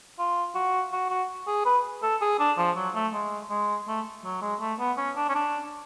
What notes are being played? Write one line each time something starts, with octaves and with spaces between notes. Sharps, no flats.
F4
F#4
F#4
F#4
G#4
B4
A4
G#4
D4
F3
F#3
A3
G#3
G#3
A3
F#3
G#3
A3
B3
C#4
D4
C#4
D4